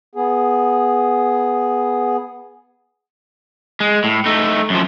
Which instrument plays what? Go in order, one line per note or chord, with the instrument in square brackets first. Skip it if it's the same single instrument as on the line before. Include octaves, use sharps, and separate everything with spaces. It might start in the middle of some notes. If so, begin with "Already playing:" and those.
[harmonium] B3 G#4
[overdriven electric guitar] G#3
A2
A3 D#4
F#2 F3